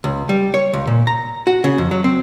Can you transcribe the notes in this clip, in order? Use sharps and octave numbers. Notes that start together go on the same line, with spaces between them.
C#2
G3
C#5
C#2
A#2
A#5
F#4
C#3
F2
F#3
C4